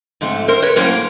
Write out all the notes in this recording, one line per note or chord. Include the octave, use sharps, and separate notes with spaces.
G#2 F3 A3 C4
A#4 C5
B4 C#5
A2 F#3 A#3 C#4 A#4 C5